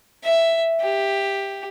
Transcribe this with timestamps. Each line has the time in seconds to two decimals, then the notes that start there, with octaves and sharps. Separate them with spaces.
0.25 E5
0.81 G4